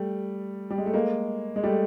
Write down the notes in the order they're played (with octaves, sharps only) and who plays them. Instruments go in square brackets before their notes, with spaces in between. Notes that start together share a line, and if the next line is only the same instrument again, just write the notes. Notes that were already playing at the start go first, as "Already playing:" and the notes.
Already playing: [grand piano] G3 A3
G3
G#3
A3
G#3 A#3
G#3
G3 A3